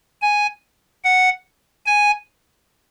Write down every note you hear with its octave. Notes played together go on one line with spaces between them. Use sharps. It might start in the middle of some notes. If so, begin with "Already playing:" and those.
G#5
F#5
G#5